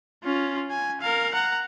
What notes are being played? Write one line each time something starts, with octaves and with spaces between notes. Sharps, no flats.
C#4 F4
G#5
A#4 F5
F#5 A#5